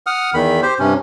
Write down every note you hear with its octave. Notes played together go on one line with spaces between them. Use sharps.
F#5 D#6 F6
E2 D#3 B5
G4 C5
G2 C3 C#4